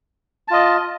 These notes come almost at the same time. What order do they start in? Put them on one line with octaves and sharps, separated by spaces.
A5 F4 D#5